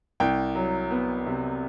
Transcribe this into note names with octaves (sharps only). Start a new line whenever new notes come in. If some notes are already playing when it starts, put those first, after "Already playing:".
C2 G5
F#3
B3
C3